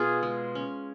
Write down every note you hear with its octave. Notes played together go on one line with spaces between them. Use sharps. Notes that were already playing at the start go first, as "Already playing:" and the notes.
Already playing: B2 F4 G#4
G#3
C#4